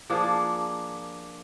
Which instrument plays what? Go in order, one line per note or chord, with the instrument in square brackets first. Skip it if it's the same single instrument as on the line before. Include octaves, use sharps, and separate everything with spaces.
[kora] F3 A#3 D4 G#4